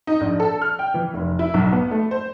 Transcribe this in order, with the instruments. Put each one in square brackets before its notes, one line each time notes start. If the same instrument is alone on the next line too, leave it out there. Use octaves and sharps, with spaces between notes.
[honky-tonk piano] D#4
A#1
A4
F6
G5
E3
F1
E4
B1
B3
A3
C5